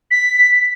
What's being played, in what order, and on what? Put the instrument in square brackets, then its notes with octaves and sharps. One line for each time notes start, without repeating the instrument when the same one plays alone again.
[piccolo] B6